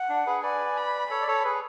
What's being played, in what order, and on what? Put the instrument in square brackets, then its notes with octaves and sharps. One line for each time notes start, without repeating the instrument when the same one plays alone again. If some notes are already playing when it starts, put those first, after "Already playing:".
Already playing: [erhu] F#5
[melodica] D4
G#4 B4
[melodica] B4 D5 [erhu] G#5
[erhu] B5
[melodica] A4 C#5 [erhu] B5
[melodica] D5
A4 C#5
G#4 B4